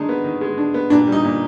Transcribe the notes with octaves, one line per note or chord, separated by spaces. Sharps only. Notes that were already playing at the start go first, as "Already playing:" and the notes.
Already playing: D#3 G#3 D4 D#4
B3
D#3
G#3
D4
B3
A#2 D4
G3
D#4
A#2